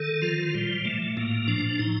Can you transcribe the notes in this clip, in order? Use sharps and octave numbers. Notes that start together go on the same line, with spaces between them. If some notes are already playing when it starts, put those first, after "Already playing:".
Already playing: D#3 A4
F3 F4
A#2 G3
A#2 A3
A2 A#3
F3 D4
A2 D#4